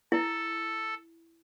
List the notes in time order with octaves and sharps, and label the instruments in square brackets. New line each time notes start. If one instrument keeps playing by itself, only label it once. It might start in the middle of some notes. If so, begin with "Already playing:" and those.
[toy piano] E4 [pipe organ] A4